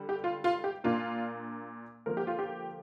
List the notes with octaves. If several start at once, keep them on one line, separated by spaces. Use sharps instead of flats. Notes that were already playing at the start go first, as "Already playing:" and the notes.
Already playing: D3 G3
G4
F4
F4
G4
A#2 A#3 D4 F4
D3 F3 A#3 A#4
G4
F4
G4